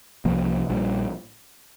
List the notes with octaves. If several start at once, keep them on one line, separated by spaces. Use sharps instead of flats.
C2 C3 F3 A#3
A#1 A#2 G3